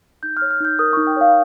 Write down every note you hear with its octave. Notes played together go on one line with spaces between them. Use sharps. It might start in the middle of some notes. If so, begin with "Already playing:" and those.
D#4 G6
F6
C#5
F6
D#4 G6
A#4 D#6
D#4 C#6
G5
C#5 F5